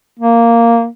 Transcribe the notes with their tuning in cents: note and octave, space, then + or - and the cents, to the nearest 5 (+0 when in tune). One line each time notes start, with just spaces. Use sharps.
A#3 -5